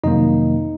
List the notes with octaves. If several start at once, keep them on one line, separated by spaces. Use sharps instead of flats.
F2 C3 D#3 F#3 A#3 D#4 D#5